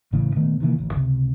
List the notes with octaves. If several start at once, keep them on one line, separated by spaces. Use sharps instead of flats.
A1 A2 C#3 E3
A#2 D#3 A3 B3
C3 D#3 E3 A#3
D1 A1
C#2 C3